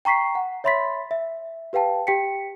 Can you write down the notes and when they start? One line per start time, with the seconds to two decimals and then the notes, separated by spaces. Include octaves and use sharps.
0.05 G5 A#5 C#6 B6 C7
0.35 F#5
0.64 C#5 E5 B5 C6 A6 B6
1.11 E5
1.73 G4 B4 F5 G5 A5
2.07 G4 G5 B6 C#7